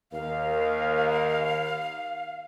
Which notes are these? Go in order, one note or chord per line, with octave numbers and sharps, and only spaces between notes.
D#2 A#4 F5